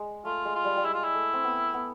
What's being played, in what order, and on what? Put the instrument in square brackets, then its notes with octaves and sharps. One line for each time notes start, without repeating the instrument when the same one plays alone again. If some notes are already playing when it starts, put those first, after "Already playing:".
Already playing: [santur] G#3
[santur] A3 [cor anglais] F4
[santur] G#3
[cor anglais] F4
[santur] G3
G3
[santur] G#3 [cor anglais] E4
[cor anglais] F4
E4
[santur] A3
C4
B3
B3